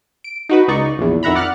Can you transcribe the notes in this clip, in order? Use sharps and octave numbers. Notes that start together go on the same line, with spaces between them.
D7
D#4 F#4 B4
C#2 D#4 D5 C#6
A#1 E2
F2 D#3 E5 F#5 A#5 B5
D5 F#5 F6 F#6 A6